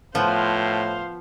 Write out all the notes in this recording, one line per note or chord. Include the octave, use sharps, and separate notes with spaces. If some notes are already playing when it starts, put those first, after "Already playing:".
A2 F3 B3 C5 F5